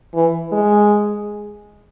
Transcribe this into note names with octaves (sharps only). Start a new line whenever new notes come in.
E3
G#3